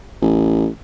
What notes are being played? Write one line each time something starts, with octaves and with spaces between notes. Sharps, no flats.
A1